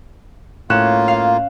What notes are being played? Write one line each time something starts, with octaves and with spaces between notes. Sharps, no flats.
A2 A#3 C#4 F4 F#6 E7
F5